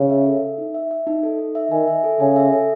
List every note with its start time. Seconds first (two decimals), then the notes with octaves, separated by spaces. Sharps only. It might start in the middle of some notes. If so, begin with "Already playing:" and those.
Already playing: C#3
0.10 E5
0.26 A4
0.42 E5
0.58 D#4
0.74 E5
0.91 E5
1.07 D#4
1.23 A4
1.39 D#4
1.55 E5
1.71 D#3 G#5
1.87 E5
2.04 A4
2.20 C#3 G#5
2.36 E5
2.52 A4